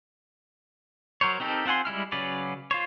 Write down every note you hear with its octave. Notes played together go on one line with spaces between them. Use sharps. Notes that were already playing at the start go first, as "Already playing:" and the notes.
F#3 A#4 C5 C#5
C4 D#4 G4 A4 A#4
C4 F4 F#5 G#5 C6
G3 G#3 E4 F6
C#3 F#3 C#4 B4 D5
F4 C5 C#5